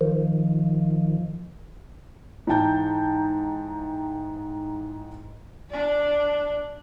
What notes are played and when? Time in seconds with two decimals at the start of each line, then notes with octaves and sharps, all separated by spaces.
0.01 D#3 F3
2.47 G#2 E3 D#4 G5 A5 G6
5.70 D4 D5